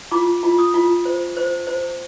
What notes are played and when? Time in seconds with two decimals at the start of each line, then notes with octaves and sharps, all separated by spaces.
0.11 F4 D6
0.43 F4
0.59 D#6
0.74 F4
1.05 C5
1.37 C5
1.67 C5